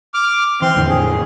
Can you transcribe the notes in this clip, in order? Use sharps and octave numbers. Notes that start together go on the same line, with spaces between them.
D6 F6
E3 C4 C6 F6
E2 A2 D3
G#4